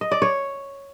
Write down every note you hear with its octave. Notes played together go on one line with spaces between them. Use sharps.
D#5
D5
C#5